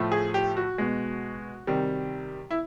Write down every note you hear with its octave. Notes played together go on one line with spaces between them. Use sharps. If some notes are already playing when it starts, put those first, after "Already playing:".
Already playing: A2 F3 A3
G#4
G4
F#4
B2 G#3
C3 D#3 G3
E4